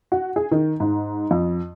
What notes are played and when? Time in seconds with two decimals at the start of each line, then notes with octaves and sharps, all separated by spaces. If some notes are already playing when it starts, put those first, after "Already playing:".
0.12 F#4
0.36 G#4
0.52 D#3
0.80 G#2
1.31 F2